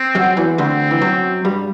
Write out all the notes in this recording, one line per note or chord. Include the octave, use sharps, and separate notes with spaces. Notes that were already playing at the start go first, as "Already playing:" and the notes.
Already playing: C4
F#2 F#3
E2 E3
D2 D3 C4
E3
F#2 F#3
G2 G3